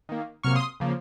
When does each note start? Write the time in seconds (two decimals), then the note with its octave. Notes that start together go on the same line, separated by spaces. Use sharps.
0.09 D#3 A#3
0.43 C3 F#3 A#3 C#6 F6
0.55 C6 D#6
0.80 C#3 F3 A#3